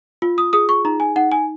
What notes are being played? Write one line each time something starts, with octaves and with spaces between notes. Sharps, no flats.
F4
D#6
G#4 D#6
C#6
D#4 A#5
G#5
D#4 F#5
G#5